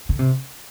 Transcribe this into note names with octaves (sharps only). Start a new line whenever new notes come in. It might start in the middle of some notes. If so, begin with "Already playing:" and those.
D3
C3